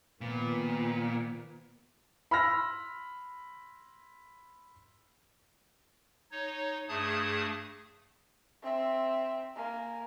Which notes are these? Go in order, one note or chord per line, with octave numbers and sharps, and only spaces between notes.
A#2 D#3 F3 B3
B5 C6 E6 F6 A#6
D#4 C#5
G2 A3 G#4 A5 D#6 G#6
C4 E5
A#3 G#5